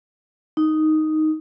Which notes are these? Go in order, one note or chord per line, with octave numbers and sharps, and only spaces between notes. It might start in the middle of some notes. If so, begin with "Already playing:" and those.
D#4